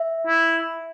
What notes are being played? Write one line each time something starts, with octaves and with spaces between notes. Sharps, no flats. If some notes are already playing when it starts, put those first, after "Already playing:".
Already playing: E5
E4